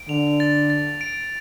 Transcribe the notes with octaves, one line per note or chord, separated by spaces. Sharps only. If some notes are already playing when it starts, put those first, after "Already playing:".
Already playing: D7
D3 F7
A6
A6
D7